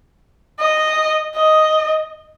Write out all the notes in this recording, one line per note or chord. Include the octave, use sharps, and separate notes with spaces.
D#5
D#5